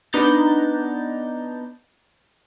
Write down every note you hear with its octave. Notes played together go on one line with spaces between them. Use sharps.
B3 D4 D#4 A#5 G6 A6